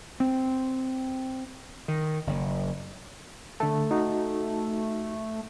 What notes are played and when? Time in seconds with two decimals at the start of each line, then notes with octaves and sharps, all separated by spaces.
0.20 C4
1.88 D#3
2.27 F#1
3.60 D3 A3 A5
3.91 D#4 F#4